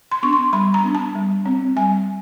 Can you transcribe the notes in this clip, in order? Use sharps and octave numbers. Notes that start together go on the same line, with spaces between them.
C6
B3 D4 C#6
C6
G3 B5
A#5
B3 D4
A5
G3
C4
G3 G#5